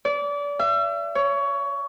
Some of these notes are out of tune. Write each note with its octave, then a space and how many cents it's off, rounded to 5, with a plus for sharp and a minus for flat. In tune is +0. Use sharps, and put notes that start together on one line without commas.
D5 -30
E5 +40
C#5 +20